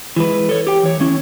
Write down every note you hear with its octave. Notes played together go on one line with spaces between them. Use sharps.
E3 G#3 B4
A4 C#5
G4 G5
E3 C#5
E3 C#4 E4